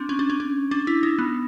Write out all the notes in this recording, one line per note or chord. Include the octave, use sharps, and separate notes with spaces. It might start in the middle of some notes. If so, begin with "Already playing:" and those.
Already playing: C4 D4
C#4
D4
C#4
C#4
D4
E4
D#4
B3